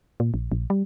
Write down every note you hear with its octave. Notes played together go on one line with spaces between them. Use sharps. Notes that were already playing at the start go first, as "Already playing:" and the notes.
A#2
A#1
A#1
G3